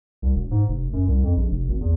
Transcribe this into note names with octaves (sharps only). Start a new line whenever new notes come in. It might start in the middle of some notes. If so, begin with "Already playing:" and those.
C2
E1
G#2
F1
F#2
C2
F2
A#1
F1
G#1
E2